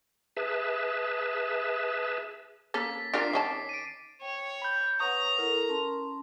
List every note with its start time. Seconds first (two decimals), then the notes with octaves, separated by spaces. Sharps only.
0.37 G#4 B4 E5 A5
2.74 A#3 C#4 A4 A6 B6
2.94 B6
3.14 D4 F4 A#4 D6 C7 D7
3.33 D#3 C#4 A5
3.69 D7 D#7
4.22 C#5 G5
4.62 B5 G6
5.00 B4 C#5 F#5 A#5 C#6 D#6
5.38 E4 A4 A#4
5.69 C#4 A5 C6